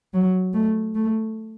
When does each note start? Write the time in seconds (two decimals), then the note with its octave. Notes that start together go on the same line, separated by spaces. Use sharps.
0.14 F#3
0.54 A3
0.95 A3